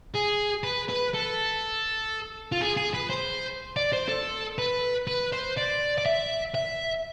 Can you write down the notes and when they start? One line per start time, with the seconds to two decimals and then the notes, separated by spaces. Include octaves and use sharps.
0.14 G#4
0.64 B4
0.89 B4
1.14 A4
2.52 F4
2.61 G#4
2.77 G#4
2.94 B4
3.10 C5
3.77 D5
3.93 C5
4.08 A4
4.58 B4
5.08 B4
5.32 C5
5.57 D5
5.98 D5
6.06 E5
6.55 E5